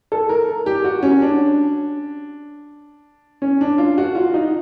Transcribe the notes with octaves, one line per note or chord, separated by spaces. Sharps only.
A4
A#4
G4
F#4
C#4
D4
C#4
D4
F4
F#4
F4
D#4